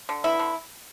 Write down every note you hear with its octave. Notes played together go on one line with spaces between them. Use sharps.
D3
B3 E4
D3